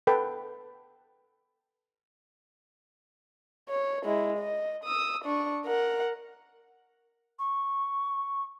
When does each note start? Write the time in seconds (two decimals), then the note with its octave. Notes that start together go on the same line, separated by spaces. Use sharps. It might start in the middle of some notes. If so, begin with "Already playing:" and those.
0.07 A4 B4 G5
3.69 C#5
4.04 G#3 E4
4.38 D#5
4.84 D#6 E6
5.25 D4 C#6
5.66 A#4 F#5
7.39 C#6